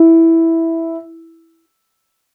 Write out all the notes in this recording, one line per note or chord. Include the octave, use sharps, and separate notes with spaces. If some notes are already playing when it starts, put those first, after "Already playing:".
Already playing: E4